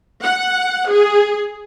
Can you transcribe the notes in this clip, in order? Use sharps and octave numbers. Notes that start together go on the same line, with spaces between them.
F#5
G#4